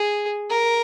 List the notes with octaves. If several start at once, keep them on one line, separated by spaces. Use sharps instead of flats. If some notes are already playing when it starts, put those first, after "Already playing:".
Already playing: G#4
A#4